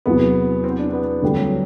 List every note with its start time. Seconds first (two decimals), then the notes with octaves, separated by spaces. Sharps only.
0.06 E2 C3 F#3 B3
0.64 C4
0.79 D4
0.93 B3
1.22 D2 D3 G3 C4 G4
1.36 F#3